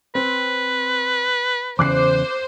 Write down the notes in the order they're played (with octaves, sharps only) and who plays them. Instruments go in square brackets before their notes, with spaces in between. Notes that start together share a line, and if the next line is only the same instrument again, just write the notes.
[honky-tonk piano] C4 [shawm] B4
[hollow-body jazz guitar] E2 C#3 [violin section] C5 [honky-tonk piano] D6 F#6 C7